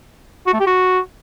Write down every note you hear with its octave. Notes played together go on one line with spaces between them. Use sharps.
F#4
A3
G4
F#4